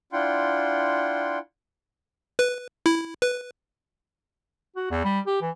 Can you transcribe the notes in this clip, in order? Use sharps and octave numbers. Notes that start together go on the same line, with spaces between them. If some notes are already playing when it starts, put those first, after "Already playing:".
D4 E4 F4 F#5 G5 C6
B4
E4
B4
F#4
E2
G3
G4
E3